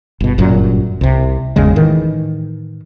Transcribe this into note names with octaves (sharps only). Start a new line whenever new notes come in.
G1 B2
G1 F#2 A#2 F#3
C2 C3
G#1 E2 C#3 G#3
A2 D#3 E3